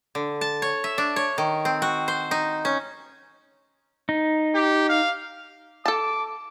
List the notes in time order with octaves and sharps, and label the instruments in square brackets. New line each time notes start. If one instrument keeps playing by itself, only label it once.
[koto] D3
A5
C#5
E5
D4
C#5
D#3
C4
F#4
C5
D#4
C#4
[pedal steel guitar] D#4
[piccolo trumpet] G4
F5
[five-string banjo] A4 A5 [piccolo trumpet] D6